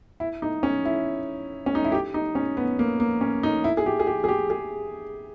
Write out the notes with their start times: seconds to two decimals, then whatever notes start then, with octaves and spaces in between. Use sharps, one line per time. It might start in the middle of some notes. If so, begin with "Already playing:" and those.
0.20 E4
0.42 D#4
0.63 C#4
0.85 E4
1.66 C#4
1.75 D#4
1.85 E4
1.92 G4
2.14 D#4
2.35 C#4
2.57 B3
2.79 A#3
3.00 A#3
3.21 C#4
3.43 D#4
3.64 E4
3.77 G#4
3.86 G4
4.00 G#4
4.07 G4
4.24 G#4
4.28 G4
4.50 G#4